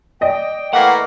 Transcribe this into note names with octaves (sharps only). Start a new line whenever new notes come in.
D5 D#5 G5
E3 A3 A#3 F#5